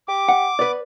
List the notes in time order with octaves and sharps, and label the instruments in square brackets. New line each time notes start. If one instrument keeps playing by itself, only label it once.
[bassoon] G4 [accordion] D6
[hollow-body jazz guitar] F#5
[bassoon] B3 [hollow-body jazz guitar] B4 D5